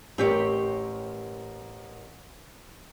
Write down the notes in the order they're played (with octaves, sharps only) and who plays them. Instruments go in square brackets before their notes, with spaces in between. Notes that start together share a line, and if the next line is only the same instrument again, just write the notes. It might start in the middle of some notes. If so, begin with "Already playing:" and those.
[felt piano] A1 A#4 [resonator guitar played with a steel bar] C4 G4 C#5